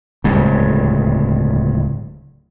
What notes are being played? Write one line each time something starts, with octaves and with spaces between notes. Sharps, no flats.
D1 C#2 G2